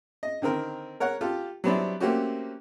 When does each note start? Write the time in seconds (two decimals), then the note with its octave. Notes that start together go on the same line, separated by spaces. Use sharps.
0.23 D#5
0.42 D3 D#3 C4 A#4
1.00 A#4 C#5 F#5
1.21 F4 G4 A4
1.64 F#3 G3 B3 C4 D4 E4
2.00 A3 A#3 C4 C#4 F#4 G4